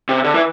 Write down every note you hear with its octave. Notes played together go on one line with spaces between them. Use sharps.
C3
D3
E3